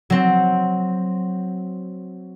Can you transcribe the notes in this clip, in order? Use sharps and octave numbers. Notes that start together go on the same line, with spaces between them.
F#3 C4